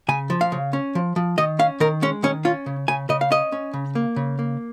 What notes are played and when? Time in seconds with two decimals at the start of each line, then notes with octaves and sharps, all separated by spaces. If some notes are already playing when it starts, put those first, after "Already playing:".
0.08 C#3 G#5
0.30 F3
0.41 F5
0.52 C#3
0.73 C#4
0.95 F3
1.16 F3
1.38 D#3 D#5
1.59 C#4 F5
1.80 D#3 A#4
2.02 G#3 C#4
2.23 D#3 C#4
2.45 C#4 F4
2.66 C#3
2.88 C#3 G#5
3.09 C#3 D#5
3.21 F5
3.30 C#4 D#5
3.52 C#4
3.74 C#3
3.95 A#3
4.16 C#3
4.39 A#3